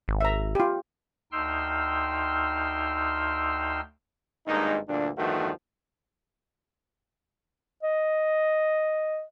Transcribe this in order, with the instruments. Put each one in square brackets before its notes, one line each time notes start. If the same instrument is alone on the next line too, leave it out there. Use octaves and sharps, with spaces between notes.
[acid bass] G#1
[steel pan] E5 A#5
F4 G4
[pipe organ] D2 D#4 G5 C6 E6 F6
[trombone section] G#1 G2 G#3 A#3 D#4
D2 G2 A#2 D3 D4
E2 G2 D#3 F3 A3 F#4
[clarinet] D#5